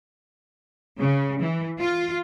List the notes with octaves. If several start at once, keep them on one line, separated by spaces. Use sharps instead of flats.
C#3
E3
F4